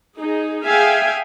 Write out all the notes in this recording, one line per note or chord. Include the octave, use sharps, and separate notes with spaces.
D#4 G#4
G#4 E5 F5 G5 G#5